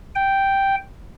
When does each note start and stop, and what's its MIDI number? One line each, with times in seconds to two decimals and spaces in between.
0.15 0.76 79